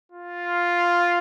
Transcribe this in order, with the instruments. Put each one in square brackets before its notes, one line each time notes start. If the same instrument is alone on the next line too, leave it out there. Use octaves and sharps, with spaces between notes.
[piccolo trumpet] F4